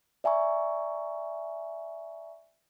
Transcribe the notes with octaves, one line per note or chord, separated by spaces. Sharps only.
D5 E5 G#5 A#5 C#6